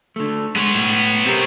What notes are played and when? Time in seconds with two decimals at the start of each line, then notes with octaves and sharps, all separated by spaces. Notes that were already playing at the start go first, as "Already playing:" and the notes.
0.16 D3 A3
0.56 G#3 B3 C#5
0.75 A2
1.25 C4 G4 A#4